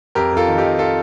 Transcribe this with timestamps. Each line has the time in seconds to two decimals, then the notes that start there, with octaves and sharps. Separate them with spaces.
0.15 F2 G4 A#4
0.32 F2 F4 A4
0.48 D#3
0.58 D#4 G4
0.64 F2
0.79 F4 A4